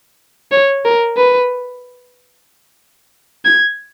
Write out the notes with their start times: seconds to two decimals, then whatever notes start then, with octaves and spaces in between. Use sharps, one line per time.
0.52 C#5
0.85 A#4
1.17 B4
3.45 G#6